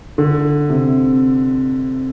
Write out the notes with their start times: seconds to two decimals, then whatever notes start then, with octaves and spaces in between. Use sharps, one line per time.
0.18 D3
0.70 C3